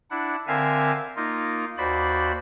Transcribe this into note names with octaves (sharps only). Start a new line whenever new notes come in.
D4 E4 F#5
D3 C4 A#4 E5 F5 G#5
A#3 D#4 F4
D#2 F#4 C5 D5 B5